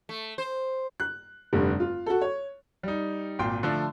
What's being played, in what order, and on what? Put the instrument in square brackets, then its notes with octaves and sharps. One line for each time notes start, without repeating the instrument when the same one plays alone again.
[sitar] A3
C5
[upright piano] F#6
F1 G2 D3
F4
F#4 A4
C#5
[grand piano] G3 D#4
G#1 A#2 G5 C6
D3 F3 A3